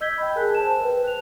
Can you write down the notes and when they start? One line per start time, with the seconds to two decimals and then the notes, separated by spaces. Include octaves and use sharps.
0.01 D#5 E6 G6 G#6 B6 G7
0.18 G5 B5
0.36 G#4 A#4 G#5 A5 F#6
0.55 C5 A5 E7
0.84 B4 G5
1.04 F#6 F7